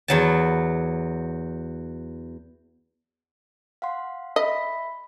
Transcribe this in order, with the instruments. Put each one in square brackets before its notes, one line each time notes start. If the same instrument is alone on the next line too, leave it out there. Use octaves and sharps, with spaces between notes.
[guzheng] E2 F#3 A5
[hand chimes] F5 F#5 C6
[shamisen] D#5 [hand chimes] E5 B5 B6